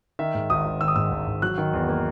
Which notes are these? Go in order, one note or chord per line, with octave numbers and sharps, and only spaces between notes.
D#3 E5
G#2
G#1 D#6
G#1
D#3 E6
D#6
G#2 E6
G#1
G#1
F#3 F#6
D#3
E2
A#3